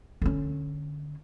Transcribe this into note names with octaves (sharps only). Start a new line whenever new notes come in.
D3 C#4